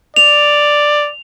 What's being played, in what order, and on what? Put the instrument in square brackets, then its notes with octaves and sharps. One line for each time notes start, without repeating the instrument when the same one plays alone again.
[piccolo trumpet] D5 [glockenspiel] F7